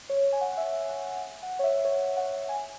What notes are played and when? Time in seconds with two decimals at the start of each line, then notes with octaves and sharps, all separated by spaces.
0.09 C#5
0.32 G#5
0.41 F#5
0.53 F#5
0.57 E5
0.89 F#5
1.43 F#5
1.59 C#5
1.63 E5
1.85 C#5
2.17 F#5
2.49 G#5